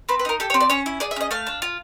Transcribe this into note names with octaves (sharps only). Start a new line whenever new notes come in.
C4 B4
B4
D#4 A#4
G4 A4
C#5
C4
D5
C#4 C#5
E4
G#4 D5
E5
C#4 D#5
A3 F5
D4
F4